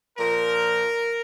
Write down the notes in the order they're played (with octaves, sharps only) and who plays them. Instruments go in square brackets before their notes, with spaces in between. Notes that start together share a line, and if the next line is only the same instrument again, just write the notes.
[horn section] A#2 F3 A#4